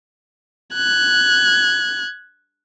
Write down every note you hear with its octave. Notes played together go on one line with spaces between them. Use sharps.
F#6 G#6